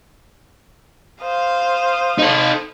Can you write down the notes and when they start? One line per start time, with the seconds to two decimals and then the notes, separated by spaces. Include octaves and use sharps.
1.22 C5 F5 D#6
2.18 D#4 A4